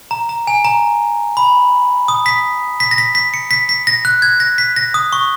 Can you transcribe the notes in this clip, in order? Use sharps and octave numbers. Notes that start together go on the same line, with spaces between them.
A#5
A#5
G#5
A#5
B5
D#6
B6
B6
A#6
B6
B6
C#7
B6
B6
A#6
F#6
G#6
A#6
B6
A#6
D#6
C#6